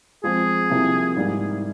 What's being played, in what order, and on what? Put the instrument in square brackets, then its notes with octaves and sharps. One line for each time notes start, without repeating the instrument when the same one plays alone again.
[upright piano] F3 G#3 C4 [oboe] G#4
[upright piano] C2 C3 F3 A#3
G#2 G3 A#3